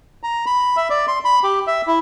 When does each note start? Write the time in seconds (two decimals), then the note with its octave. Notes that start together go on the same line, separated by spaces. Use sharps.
0.23 A#5
0.46 B5
0.77 E5
0.90 D5
1.08 C6
1.25 B5
1.43 G4
1.67 E5
1.87 E4